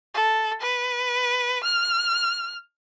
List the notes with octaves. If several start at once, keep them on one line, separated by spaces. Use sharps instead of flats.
A4
B4
F6